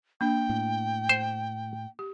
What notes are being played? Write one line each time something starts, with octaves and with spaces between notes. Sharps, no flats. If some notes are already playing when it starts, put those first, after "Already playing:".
A#3 D4 G5
A2
C5
G4